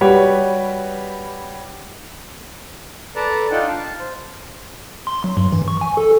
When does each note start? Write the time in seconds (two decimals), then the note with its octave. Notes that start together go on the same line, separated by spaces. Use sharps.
0.01 G3 F#4 G4 B4 C#5
3.16 A4 B4 D5 A5 A#5
3.51 D4 D#4 F4 F#5 G5
3.67 F5 A5
3.99 C5
5.07 C6
5.24 F#3
5.37 G2
5.53 E3
5.68 C#6
5.81 G#5
5.97 A4